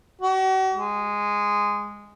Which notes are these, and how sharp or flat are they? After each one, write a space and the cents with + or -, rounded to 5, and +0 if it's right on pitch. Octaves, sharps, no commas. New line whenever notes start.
F#4 +40
G#3 -10